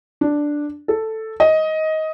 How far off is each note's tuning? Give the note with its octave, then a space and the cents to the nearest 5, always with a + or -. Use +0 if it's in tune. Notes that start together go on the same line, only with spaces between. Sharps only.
D4 +0
A4 +5
D#5 +15